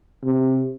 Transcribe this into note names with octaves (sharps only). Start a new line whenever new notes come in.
C3